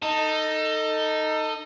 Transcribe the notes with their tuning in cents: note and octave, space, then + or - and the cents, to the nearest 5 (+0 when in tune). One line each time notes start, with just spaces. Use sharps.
D#4 +0 A4 +25